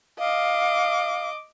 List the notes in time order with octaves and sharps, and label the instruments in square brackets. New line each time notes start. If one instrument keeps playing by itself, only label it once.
[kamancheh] D#5 D6 [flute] F5